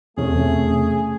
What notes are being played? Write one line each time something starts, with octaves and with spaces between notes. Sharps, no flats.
E2 C3 A3 C#4 G#4